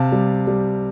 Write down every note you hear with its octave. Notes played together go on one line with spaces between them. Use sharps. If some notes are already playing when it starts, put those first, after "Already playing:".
Already playing: C3 F5 A5
G3
G3